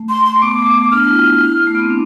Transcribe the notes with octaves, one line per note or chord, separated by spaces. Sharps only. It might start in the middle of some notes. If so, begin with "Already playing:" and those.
Already playing: A3
C6
C6
A3
B3 D6
A3
B3
D4 F6
E4
F4
E4
A3
B3
C4
D4